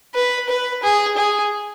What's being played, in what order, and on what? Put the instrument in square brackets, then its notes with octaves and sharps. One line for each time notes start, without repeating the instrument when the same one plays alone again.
[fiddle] B4
B4
G#4
G#4